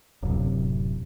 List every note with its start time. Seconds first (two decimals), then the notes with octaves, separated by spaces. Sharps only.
0.23 D1 F#2 C3